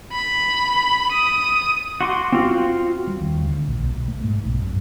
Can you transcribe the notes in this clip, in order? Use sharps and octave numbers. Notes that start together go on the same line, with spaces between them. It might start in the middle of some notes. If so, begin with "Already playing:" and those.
B5
D#6
F#4 C6 D6
C4 F4 F#4
G3
D#2
D2
A#1
B1
B1
A3
G#2
B1
F#2